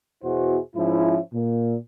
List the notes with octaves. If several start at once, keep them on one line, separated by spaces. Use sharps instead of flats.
E2 B2 E4 F#4 G#4 C5
G#2 F3 C#4 E4
A#2